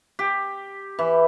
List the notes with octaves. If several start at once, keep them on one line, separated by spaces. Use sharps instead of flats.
G4
E3